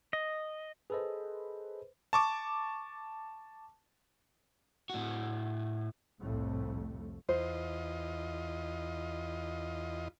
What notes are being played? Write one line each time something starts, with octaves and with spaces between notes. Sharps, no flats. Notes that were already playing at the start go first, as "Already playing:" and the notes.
D#5
G#4 A4 B4 C5 D#5
A5 C#6 D6
A2 F#4
C2 F2 A2 A3
E2 F4 C5 D#5